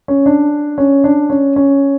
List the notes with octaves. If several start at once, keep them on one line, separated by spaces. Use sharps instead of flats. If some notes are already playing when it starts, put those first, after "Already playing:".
C#4
D4
C#4
D4
C#4
C#4